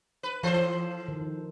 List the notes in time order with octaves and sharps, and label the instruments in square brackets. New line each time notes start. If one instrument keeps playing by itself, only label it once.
[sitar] B4
[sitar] E3 A4 C5 [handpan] F3
[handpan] D#3